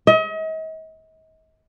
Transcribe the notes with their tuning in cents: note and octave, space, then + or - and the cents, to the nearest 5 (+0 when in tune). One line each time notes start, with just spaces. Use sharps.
D#5 +40